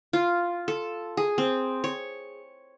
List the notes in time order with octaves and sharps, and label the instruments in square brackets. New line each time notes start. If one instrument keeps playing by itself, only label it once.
[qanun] F4
A4
G#4
C4
C#5